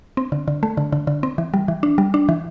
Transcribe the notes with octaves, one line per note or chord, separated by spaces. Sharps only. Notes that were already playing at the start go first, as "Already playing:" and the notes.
C4
D3
D3
A3
D3
D3
D3
C4
E3
G3
E3
D4
G3
D4
E3